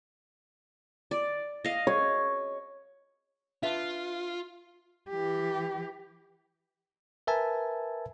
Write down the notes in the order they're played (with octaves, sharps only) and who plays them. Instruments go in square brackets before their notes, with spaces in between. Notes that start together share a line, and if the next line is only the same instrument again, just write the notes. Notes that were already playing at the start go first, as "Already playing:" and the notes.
[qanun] D5
D#5 F5
[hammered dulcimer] C#5
[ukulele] D4 B4 E5 [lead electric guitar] F4
[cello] E3 G4
[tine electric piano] A#4 B4 E5 G#5 A5